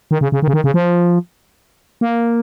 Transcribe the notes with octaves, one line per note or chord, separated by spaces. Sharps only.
D#3
C#3
C#3
D#3
C#3
D#3
C#3
F3
A#3